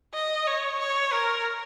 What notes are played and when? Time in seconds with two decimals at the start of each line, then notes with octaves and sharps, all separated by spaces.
0.14 D#5
0.47 C#5
0.79 C#5
1.13 A#4